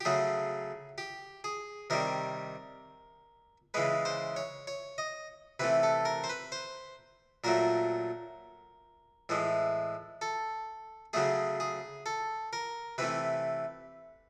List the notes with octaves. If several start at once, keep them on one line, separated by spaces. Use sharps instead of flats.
G4
C#3 F#3 A3 G#4
G4
G#4
C3 D#3 G3 A#4
C#3 E3 G#3 B4
C5
C#5
C#5
D#5
C3 E3 A3 B4
A4
A#4
C5
B4
C5
A#2 F#3 A3 A#4
A2 E3 G#3
A4
C#3 F#3 A3 G#4
G#4
A4
A#4
C3 E3 A3 B4